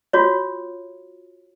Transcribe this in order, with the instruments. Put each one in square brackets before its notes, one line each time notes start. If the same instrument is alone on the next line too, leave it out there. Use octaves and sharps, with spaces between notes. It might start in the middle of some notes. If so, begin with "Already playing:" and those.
[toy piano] F4 F#4 C#5